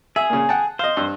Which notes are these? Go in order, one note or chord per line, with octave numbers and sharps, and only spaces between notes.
G#4 E5
A#2 C#3
F#5 G5 A5
C5 D#5 F5
G2 E6